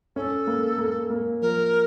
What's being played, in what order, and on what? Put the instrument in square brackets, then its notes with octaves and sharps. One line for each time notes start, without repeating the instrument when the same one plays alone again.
[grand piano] C#4 [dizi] A4
[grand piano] A#3
A#3
A#3
[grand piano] F3 [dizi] A#4